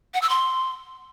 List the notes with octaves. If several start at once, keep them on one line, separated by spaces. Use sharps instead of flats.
F#5
E6
C6